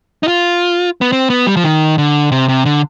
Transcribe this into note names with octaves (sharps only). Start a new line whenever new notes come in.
D#4
F4
B3
C4
B3
G3
F3
D#3
D3
C3
C3
D3